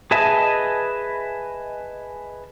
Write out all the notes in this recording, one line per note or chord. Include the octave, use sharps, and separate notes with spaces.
G#4 B4 D#5 E5 A5